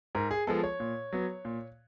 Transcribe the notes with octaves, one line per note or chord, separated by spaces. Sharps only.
G#2 A#4
G#4
F3 G#3 B3 A4
C#5
A#2
F#3 B3
A#2